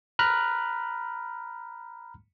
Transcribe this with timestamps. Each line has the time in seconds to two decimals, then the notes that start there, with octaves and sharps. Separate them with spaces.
0.19 A#5 B5 F6 F#6